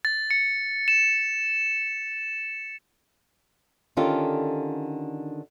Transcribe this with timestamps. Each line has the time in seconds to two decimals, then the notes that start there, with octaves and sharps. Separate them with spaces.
0.05 A6
0.31 C#7
0.88 E7
3.97 D3 D#3 C#4 F4 G4 A4